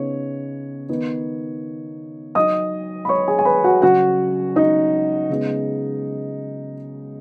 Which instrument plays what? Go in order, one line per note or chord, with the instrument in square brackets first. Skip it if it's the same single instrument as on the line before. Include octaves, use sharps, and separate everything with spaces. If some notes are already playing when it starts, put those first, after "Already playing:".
Already playing: [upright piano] C#3 B3 D#4 C#5
D#3 B3 D#4
F#3 D#4 D#5 D#6
B5
C#5 C#6
G#4 G#5
G#5
B4 B5
F#4 F#5
C#3 F#3 C#4 F#4 F#5
D#4 D#5
C#3 G#3 B3 D#4